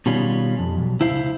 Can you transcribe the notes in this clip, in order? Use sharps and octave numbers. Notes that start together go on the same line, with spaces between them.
B2 D#3 G3 C#4 F4
F2
B1
C#2 E4 C5 F5